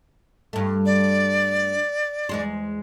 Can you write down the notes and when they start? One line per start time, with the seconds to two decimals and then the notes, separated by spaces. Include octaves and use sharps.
0.53 G2 A3
0.86 D5
2.29 E2 G#3 C5